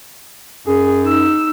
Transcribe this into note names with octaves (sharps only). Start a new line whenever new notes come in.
F#2 G#4
D#4 E6